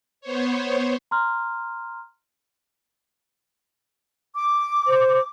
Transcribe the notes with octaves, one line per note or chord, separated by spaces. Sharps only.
B3 C5 C#5
A#5 C6 F6
D6
C5